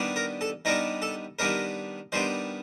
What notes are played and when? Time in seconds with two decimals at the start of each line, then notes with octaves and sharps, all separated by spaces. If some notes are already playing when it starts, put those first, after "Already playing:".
Already playing: D#3 G3 B3 D4
0.16 A#4
0.41 A4
0.65 D#3 G3 B3 D4 A#4
1.02 A4
1.39 D#3 G3 B3 D4 A#4
2.12 D#3 G3 B3 D4 C5